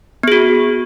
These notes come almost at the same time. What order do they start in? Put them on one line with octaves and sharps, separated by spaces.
B3 G#4 F#4